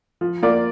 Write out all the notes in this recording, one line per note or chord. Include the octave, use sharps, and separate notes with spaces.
F3
A#3 F4 D5